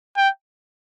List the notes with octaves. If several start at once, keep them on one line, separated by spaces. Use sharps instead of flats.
G5